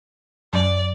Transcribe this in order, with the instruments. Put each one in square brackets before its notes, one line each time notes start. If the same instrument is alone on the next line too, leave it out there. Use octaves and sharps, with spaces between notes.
[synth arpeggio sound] F#2 [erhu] D5